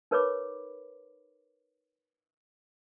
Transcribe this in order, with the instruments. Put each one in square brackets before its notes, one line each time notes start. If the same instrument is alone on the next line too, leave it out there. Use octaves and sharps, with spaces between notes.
[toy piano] D#4 A#4 B4 C#5 B5 D6